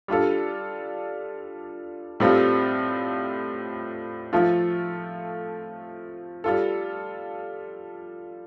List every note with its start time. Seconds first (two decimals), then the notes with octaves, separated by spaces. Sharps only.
0.08 G3 D4 F4 A4
2.20 A2 G3 C4 F4 A4
4.33 F3 A3 F4 A4
6.44 G3 F4 A4